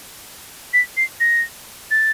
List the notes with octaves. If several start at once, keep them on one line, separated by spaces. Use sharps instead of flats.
B6
C7
A#6
A6